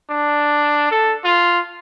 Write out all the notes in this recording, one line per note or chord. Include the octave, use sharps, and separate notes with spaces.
D4
A4
F4